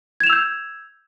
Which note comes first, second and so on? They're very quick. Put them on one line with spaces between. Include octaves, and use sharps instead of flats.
G#6 E7 F7 E6 G6